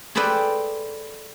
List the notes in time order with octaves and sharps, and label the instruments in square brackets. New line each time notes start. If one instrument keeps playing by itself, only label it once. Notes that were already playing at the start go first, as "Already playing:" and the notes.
[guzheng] G#4 A4 B4 C5 D5 G5